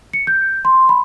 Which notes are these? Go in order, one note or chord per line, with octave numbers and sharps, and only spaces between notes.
C#7
G6
C6
B5